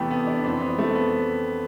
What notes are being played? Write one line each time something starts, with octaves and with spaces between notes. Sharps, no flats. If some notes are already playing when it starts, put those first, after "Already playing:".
Already playing: E2 C3 E3 A3 B3 G4 A4
B3
D4
F2 E3 C4
B3
A3
B3